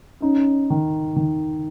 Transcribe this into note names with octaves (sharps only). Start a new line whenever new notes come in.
C#4 D#4
D#3
D#3